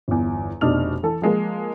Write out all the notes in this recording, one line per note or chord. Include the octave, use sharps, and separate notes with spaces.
G1 E2
F1 B2 D4 D#4 F6 F7
E3 A4
F3 G#3 A#3